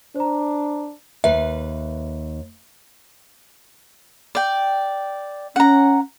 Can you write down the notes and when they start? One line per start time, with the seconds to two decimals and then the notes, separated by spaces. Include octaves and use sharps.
0.16 D4 C5 A#5
1.24 D#2 B4 E5
4.35 D5 G5
5.56 C#4 F#5 A#5